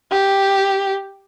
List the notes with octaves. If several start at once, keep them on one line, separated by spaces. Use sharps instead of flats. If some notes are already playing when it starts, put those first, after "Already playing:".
G4